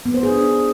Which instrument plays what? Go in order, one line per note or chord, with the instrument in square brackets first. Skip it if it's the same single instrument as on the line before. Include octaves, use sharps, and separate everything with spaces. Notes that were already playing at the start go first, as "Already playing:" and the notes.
[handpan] B3
C5
G#4
D4